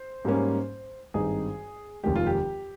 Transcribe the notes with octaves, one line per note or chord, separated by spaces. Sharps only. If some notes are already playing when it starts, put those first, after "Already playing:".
Already playing: C5
G#2 G3 A#3 C#4
G#1 G2 G3 C4 D#4 G#4
F1 D#2 D#3 G#3 G4
F4
G4